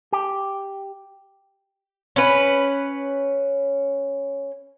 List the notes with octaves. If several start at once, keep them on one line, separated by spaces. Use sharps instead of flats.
G4
C#4 B4